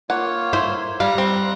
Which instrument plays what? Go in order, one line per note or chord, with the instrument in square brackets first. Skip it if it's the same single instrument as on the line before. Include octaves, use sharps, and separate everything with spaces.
[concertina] A#3 F4 C#5 [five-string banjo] F#5
[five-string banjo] E4 [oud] C5
[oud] G3 [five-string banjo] F5 [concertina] A#5 F#6
[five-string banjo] C4